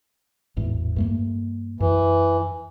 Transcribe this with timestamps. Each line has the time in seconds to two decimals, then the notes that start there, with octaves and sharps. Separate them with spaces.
0.56 G#1 E2 A2
0.96 G2 A3 A#3
1.80 F#2 E3